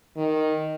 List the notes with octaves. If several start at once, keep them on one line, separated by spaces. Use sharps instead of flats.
D#3